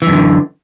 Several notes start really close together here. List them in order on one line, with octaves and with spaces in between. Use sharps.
E3 F#2 D3